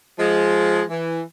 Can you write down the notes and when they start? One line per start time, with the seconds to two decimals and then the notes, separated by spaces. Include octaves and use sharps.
0.19 F3 G#3
0.89 E3